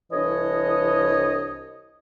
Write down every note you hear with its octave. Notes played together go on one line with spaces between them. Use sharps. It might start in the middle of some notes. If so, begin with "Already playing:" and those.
C2 E3 D4 C#5 D#5